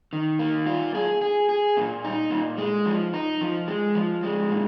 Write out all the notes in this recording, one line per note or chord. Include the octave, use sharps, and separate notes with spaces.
D#3
A#3
F4
G#4
G#4
G#4
A#2
D#4
A#2
G#3
F3
D#4
F3
G#3
F3
G#3
A#2